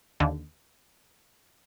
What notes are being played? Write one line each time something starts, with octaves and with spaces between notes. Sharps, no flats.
D#2 D3